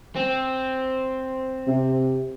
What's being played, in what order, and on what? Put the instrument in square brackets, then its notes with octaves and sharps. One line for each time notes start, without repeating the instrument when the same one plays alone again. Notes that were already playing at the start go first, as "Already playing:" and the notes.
[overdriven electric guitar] C4
[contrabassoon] C3